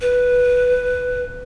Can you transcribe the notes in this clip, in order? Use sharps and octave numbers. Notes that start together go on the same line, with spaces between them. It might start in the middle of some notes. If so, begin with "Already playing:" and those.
B4